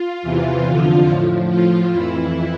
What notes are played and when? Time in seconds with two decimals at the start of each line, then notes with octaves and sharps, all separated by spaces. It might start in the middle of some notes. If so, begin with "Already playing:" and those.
Already playing: F4
0.23 E2 C3 E3
0.65 F2 D3 F3
1.08 A2 F3
1.49 A2 F3 F4
1.92 F2 E3 E4